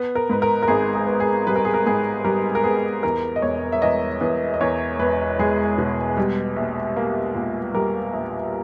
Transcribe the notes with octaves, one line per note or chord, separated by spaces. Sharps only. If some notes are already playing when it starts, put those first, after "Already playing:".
Already playing: B3
A#4
G#2 B4
A#4
A#4
G#1 G#4
G#4
B3
G#4
G3 B4
A#4
G#4
A#4
G#2 G#4
G3 A#4
A#4
B3 G#4
E2 A#4
D#5
E1 C#5
E5
E2 D#5
E2
D#5
E2 C#5
E1 B4
G#3 G#4
B2
G3
A#1
A#3
A#2
G3 A#4
A#1